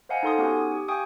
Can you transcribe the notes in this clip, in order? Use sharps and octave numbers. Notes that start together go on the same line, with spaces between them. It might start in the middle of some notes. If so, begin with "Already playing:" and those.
C5 D#5 F5 F#5 G#5 A#5
D#4 A4 C6 D#6
B3 C#4 D#4 F#4 G4 G#5
D#6
G4 D#6
F5 G5 G#5 C#6 D#6